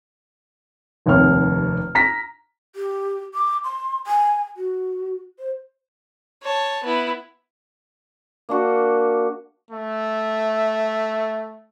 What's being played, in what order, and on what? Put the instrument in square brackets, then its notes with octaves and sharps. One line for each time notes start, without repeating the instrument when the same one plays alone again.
[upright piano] F1 D#2 C3 C#5 F6
A#5 A#6 B6
[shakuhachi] G4
D6
C6
G#5
F#4
C5
[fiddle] C#5 A5
B3 E4
[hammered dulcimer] A#3 D4 F#4 F#5
[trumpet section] A3 E5